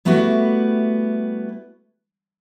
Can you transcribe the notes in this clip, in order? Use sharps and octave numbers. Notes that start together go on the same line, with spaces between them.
G3 A3 B3 E4 F#4 G4